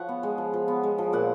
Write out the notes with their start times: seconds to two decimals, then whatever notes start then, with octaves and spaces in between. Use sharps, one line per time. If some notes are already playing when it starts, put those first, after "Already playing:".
Already playing: F3 B4 C#5 F#5
0.09 B3
0.23 G#3
0.38 F3
0.53 F3
0.68 B3
0.83 G#3
0.98 F3
1.13 A#2 F#5